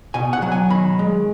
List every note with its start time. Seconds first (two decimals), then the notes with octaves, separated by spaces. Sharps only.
0.14 B2 G#5
0.33 F#5
0.42 F#3
0.52 G#5
0.70 D#3 B5
0.99 G#3